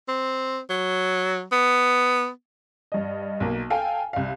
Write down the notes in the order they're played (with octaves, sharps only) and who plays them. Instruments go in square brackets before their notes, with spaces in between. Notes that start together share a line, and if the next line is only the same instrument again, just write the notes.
[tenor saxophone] C4
F#3
B3
[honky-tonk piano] G2 D#5
B1 A#3
A4 F5 G5 G#5
C2 F5